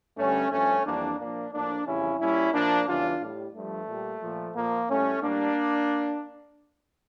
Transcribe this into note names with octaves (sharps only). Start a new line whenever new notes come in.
G2 D3 G3 A3 C#4
G2 F3 A3 C#4
F2 E3 G3 A#3 D4
A#2 F3 A#3 D4
A2 F3 A#3 D4
F2 C#3 E3 G3 C#4 E4
A#2 G3 C#4 E4
A#2 F3 A#3 D4
E2 C#3 E3 G3 D4 F4
A2 G3
G2 F3 A3
A#2 G3
A#2 F3
A#2 F3 A#3
A2 G3 A3 C#4
A2 G3 A#3 D4